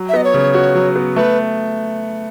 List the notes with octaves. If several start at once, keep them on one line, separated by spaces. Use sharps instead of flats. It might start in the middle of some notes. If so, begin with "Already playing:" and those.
Already playing: F#3
E5
B3 D#5
C#5
C#3
F#4
F#3
B3
A3 B4